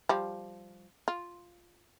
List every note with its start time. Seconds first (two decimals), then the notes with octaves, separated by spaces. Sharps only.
0.09 F3 G3
1.08 F4